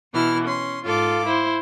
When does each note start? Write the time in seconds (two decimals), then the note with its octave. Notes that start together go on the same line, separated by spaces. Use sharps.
0.13 B2 E3 E4 F6
0.44 C#4 C6
0.84 G#2 F4 A4 F5 D6
1.24 E4 C5